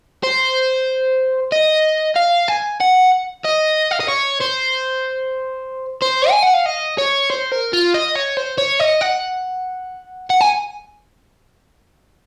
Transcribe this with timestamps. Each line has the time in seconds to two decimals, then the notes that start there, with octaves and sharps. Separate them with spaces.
0.23 C5
1.52 D#5
2.16 F5
2.48 G#5
2.80 F#5
3.44 D#5
3.91 F5
4.00 D#5
4.09 C#5
4.41 C5
6.02 C5
6.30 G#5
6.43 F#5
6.54 F5
6.66 D#5
6.98 C#5
7.30 C5
7.51 A#4
7.73 F4
7.94 D#5
8.15 C#5
8.37 C5
8.58 C#5
8.80 D#5
9.01 F#5
10.30 F#5
10.41 G#5